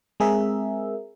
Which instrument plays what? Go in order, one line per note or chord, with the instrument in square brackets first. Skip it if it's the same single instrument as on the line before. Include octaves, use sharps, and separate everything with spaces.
[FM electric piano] G#3 C4 G#4 A#4 E5